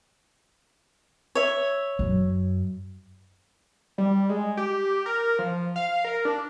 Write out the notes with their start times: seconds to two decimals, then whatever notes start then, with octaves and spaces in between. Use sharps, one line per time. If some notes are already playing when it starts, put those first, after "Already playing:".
1.35 C#5 E5
1.99 F#2
3.98 G3
4.29 G#3
4.57 G4
5.06 A#4
5.39 F3
5.76 F5
6.05 A#4
6.25 D4